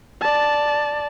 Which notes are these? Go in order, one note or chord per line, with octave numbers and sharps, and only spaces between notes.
D5 A5